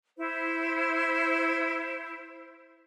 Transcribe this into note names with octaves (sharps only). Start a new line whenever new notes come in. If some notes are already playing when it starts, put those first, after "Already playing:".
E4 C5